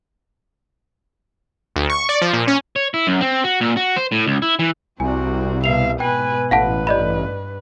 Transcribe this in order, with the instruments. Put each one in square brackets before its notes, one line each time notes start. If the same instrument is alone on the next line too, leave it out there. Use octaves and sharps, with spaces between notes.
[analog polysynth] D2
C#6
D5
F3
A#2
C#4
[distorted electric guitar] C#5
E4
F#2
C4
F#4
A#2
F#4
C5
A2
C#2
E4
E3
[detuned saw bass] C2 [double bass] C3 G3 [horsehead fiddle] C4 F#4 [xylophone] G#5
[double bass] B2 [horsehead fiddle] E5 F5 [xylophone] C7 F7
[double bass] G#2 B2 [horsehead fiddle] B4 G#5 [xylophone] G5
[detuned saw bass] A1 [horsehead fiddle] B4 [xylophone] F5 F#5 A5
[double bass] G2 [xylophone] D5 D#5 B5